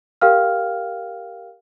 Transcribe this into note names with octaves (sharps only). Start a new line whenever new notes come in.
G4 A#4 F5 G5 F6